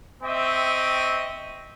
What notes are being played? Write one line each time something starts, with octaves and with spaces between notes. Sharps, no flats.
C4 D#5 E5 G5 C#6